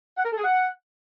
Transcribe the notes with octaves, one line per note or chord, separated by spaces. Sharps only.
F#5
A#4
A4
G#4
F#5